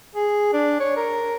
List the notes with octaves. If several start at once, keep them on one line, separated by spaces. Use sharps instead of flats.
G#4
D4
C#5
A#4